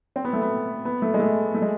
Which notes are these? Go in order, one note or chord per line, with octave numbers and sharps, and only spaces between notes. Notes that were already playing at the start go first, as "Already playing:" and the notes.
C4
B3
A3
B3
B3
A3
G#3
A3
A3
G#3